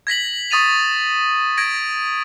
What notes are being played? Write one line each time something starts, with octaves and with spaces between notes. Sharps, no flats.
G#6 A#6 B6 F#7
C#6 D#6 A6 D#7 F7
G#6 A#6 D7